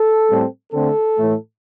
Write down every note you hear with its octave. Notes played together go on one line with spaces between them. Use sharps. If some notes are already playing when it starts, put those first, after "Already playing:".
Already playing: A4
A2 G3 C4
D3 A3 C4 A4
A2 E3 A3